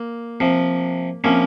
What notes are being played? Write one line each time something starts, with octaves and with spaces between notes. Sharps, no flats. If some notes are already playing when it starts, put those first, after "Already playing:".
Already playing: A#3
C3 F3
C3 F3 A#3 C#4